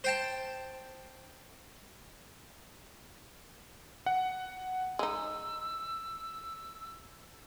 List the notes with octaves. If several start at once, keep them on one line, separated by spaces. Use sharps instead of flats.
C5 G5 A5
F#5
G#3 D#4 E6